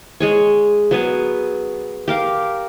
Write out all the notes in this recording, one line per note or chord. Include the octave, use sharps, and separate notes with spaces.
G#3 G#4 C#5
F#3 B3 G#4
G4 A#4 F5